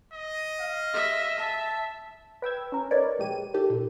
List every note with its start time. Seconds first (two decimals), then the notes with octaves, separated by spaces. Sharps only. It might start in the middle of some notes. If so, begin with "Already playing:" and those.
0.13 D#5
0.60 F5
0.94 E5
1.39 E5 A5
2.42 B4 G5 E6 G#6
2.72 C#4 A#4
2.91 D#4 A#4 B4 C#5 D5
3.19 A#1 G#3 G4 D#7
3.54 A#3 D#4 G4 A4
3.70 A#2